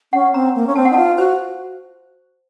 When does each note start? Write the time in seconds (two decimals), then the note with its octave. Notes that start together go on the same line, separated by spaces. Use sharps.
0.13 C#4 F#5
0.34 C4 A#5
0.55 A#3
0.67 C#4
0.75 C4 A5
0.85 F#5
0.91 D#4
0.94 F4 A5
1.18 F#4 C5